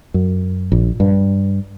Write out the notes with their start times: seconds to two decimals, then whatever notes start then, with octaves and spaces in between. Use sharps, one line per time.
0.14 F#2
0.72 A#1
1.00 G2